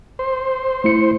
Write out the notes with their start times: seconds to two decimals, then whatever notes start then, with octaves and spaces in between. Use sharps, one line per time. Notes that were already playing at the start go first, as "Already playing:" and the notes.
0.19 C5
0.84 A3 E4 C#7